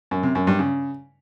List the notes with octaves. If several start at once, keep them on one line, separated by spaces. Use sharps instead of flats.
F#2
C3
F#2
G2
C#3